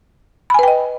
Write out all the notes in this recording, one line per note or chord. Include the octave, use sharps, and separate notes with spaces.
B4 D#5 G5 G#5 B5